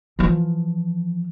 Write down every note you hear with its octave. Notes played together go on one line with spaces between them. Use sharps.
E3 F3